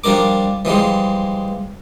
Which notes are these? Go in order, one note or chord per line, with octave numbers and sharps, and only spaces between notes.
F3 G3 D4 A#4 D6
E3 F3 G3 G#3